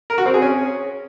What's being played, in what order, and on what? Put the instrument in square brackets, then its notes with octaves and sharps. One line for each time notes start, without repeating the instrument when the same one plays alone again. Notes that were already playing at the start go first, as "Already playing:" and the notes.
[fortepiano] A#4
F#4
C4
G#4
C#4